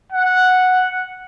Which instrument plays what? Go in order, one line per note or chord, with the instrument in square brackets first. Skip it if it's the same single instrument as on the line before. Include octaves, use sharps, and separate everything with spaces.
[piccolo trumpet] F#5